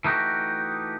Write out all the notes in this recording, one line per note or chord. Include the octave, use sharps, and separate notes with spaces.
E3 A3 D#4 F#4 G4